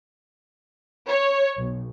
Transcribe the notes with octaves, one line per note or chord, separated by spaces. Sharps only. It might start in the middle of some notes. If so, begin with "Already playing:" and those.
C#5
B1